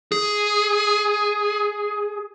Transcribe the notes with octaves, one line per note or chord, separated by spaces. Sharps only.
G#4